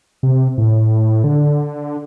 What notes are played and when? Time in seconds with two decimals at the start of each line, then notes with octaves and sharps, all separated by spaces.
0.23 C3
0.58 A2
1.24 D3